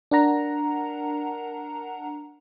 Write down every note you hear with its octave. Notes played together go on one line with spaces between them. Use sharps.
D4 A#4 F#5 A#5